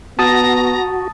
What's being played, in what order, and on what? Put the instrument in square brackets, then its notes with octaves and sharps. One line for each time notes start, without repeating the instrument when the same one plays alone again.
[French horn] B3 [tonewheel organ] F#4 [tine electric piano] A5 D#6 A6 [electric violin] A#5 A#6